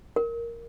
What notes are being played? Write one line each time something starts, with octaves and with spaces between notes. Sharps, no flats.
A#4